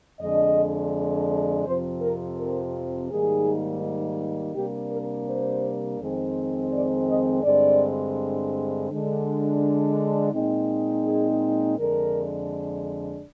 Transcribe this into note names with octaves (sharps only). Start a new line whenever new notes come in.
F2 D3 G#3 D4 D#5
F2 C3 F3 C4 C5
A#4
A#4
G#2 D#3 G3 A#3 D#4 G#4
C3 G3 A#3 D4 G4
A#4
C5
F2 D#3 G#3 C4 D#4
D5
D#5
G2 D3 G#3 C4 D5
D3 G#3 D4
A#2 G#3 C4 D#4
G#4
F2 D3 G#3 D4 A#4